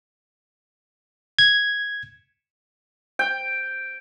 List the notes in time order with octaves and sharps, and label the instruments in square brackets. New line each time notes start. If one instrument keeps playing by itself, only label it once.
[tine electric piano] G#6
[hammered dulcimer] G5